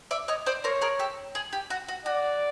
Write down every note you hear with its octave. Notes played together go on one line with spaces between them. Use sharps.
D5 E5
C#5 D#5
C5 D5
A#4 C5 C#5
G#4 A#4
G4 A4
G#4
G4
F#4
F#4
F#4 D5